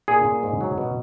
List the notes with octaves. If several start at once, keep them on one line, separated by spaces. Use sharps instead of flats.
A#2 G#4
A#2
G#2
F#3
B2